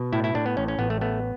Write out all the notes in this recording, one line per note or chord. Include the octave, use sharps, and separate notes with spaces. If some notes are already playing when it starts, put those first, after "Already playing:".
Already playing: B2
A2 E4
E4
A2 D4
B3
A1 C#4
C#4
A1 B3
A3
A3 B3